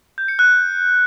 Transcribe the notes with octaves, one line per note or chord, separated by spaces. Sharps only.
G6
C#7
F#6